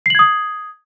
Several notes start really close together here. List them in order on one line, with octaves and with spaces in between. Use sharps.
C7 F#7 G#6 D#6